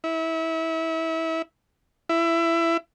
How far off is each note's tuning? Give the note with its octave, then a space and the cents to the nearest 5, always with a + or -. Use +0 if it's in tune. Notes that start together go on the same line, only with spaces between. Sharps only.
E4 -25
E4 +20